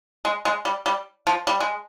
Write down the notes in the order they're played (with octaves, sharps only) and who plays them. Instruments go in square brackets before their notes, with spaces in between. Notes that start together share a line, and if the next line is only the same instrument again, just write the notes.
[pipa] G#3
G#3
G3
G3
F3
G3
G#3